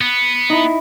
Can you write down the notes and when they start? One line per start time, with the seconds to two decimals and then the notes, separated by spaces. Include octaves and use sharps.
0.01 B3
0.50 D#4 E4